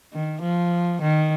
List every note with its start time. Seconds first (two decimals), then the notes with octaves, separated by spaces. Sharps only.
0.13 D#3
0.42 F3
1.01 D#3